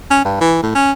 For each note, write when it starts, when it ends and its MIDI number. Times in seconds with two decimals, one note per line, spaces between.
0.11 0.22 61
0.25 0.40 43
0.41 0.58 52
0.63 0.73 45
0.75 0.92 61